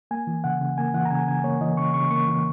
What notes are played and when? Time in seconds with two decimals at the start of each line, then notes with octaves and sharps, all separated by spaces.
0.11 A#3 G#5
0.27 E3
0.44 C#3 F#5
0.61 C#3
0.78 A#3 G#5
0.94 E3 F#5
1.05 A#5
1.10 C#3 G#5
1.28 C#3 G#5
1.44 A#3 C#5
1.61 E3 D#5
1.77 C#3 C#6
1.94 C#3 C#6
2.11 A#3 C#6
2.28 E3